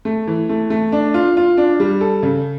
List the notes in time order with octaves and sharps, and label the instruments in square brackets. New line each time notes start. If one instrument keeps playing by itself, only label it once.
[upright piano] A3
E3
A3
A3
D4
F4
F4
D4
G3
A4
C#3